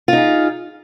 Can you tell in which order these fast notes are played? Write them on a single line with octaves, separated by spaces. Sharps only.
F4 D#4 G#4